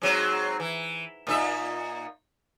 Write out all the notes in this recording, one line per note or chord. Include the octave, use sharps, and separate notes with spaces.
G#2 F#3 C4
E3
A#2 D#4 E5